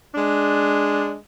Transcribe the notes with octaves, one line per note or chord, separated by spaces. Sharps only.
G#3 D4